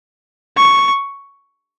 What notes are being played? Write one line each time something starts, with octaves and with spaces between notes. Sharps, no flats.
C#6